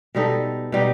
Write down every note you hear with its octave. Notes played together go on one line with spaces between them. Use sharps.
B2 G3 D#4 A4
B2 G3 D#4